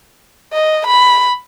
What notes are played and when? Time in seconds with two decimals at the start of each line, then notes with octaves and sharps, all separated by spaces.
0.53 D#5
0.87 B5